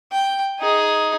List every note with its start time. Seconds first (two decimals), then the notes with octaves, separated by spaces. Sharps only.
0.12 G5
0.60 D#4 G#4